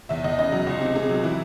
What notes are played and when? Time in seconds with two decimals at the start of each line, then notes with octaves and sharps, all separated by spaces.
0.09 E2 E5
0.24 E2 D#5
0.38 C#3 D#5
0.52 F#3
0.67 C#2
0.81 C3
0.95 C3 G#4
1.09 F#3
1.23 E3 E4